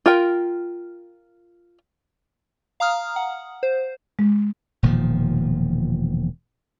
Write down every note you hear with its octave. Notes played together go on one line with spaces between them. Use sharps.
F4 A#4 G5
F5 A#5 D#6 F6
F#5
C5
G#3
E1 A#2 D#3 F3